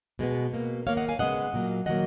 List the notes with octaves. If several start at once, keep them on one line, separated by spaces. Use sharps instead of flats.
B2 G#3 B3
B2 A#3
D#3 A#3 C#5 F5
D#5 F#5
F5 G#5
C#3 G#3 B3 D#5 F#5
A#2 F#3 A#3
D#3 F#3 A#3 D#5 F#5